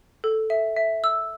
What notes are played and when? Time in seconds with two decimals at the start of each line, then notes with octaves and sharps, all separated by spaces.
0.24 A4
0.50 E5
0.76 E5
1.04 E6